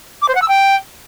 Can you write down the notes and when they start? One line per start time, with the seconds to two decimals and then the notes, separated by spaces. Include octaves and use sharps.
0.21 D6
0.28 C5
0.35 F#5
0.41 E6
0.48 G5